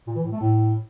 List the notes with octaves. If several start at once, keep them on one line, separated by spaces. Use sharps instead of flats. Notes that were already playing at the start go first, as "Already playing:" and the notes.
A#2
E3
A2
A3
A2